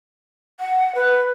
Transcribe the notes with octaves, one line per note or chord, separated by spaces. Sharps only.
F#5
B4